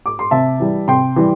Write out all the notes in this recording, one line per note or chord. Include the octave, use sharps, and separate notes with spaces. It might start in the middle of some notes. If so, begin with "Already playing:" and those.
D6
C6
C3 E5 A5
E3 G3
C3 G5 C6
E3 G3